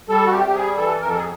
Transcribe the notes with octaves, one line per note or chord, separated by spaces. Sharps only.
G3 A4
F#4
C3 G4
G4
G3 G#4
E3 A4
F2 A#4
A4
G#4